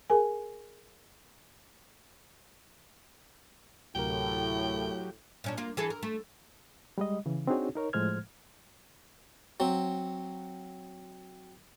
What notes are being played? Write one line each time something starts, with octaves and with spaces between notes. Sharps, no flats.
G#4 A#4 G#5
D2 A2 C3 F#3 G4 A#4 G5
A#2 C#4 D4
A#3 F4
E3 G#4 A4
A#4
A3
G3 G#3 D#5
C#3 E3
C4 D4 D#4 F#4 G#4 C#5
D#4 A#4 C#5
A2 F3 G#3 C5 F6 G#6
F#3 C4